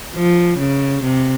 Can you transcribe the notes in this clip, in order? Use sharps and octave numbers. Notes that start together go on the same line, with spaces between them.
F3
C#3
C3